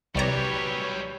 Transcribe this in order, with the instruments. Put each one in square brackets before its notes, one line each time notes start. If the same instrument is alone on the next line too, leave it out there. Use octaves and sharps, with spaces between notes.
[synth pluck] C2 D5 A#5 [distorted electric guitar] F#3 G3 [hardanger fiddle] G4 B4 [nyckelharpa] C#5